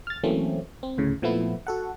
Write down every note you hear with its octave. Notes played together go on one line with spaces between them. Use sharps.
F6 A6
E3 F#3 A3 A#3 C4 C#4
C4
D2 A2 C#3
A#2 F3 A3 B3 E4
F#4 A4 F#5